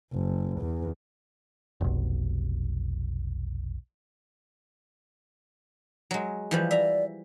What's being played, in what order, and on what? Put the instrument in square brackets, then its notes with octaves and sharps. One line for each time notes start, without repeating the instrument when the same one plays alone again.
[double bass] F#1
E2
[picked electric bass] F1 B1
[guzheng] F#3 G#3
E3 F3 G3
[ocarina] D5 [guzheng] E5 A#5